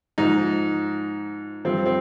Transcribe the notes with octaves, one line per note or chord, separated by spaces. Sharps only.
G#2 F3 D#4
G2 F3 C4
C4